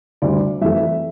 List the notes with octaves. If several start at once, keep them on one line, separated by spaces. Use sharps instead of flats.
D2 D3 G3 D5
F2 E3 A3 E5